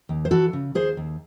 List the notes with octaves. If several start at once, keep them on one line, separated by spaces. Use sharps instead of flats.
D#2
C5
E3 F#4 A4
C#3
D#2 G#4 C5
D#2